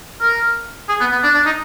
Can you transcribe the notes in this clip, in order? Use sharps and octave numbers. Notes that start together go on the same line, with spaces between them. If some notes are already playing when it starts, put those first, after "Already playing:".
A#4
G#4
B3
B3
D4
D4
D#4